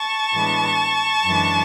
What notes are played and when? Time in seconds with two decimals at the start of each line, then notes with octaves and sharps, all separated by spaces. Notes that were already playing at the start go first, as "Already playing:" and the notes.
Already playing: A5 C#6
0.33 A2 E3 G#3 B3 D4
1.25 F#2 E3 G#3 D4